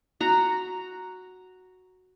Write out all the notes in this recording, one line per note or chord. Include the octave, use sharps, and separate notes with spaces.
F#4 A#5